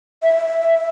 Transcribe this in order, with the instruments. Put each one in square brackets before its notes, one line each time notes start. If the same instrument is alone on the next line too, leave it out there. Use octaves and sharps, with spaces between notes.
[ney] E5